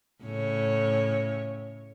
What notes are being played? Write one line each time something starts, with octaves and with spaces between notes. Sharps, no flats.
A2 C#3 C#5